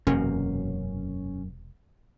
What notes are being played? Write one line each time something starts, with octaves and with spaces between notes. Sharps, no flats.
E1 F#2 C3 A#3 C#4